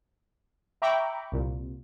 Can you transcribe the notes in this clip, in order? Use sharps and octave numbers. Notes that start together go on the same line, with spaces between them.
E5 G5 A#5 B5 C#6 D6
C2 A#2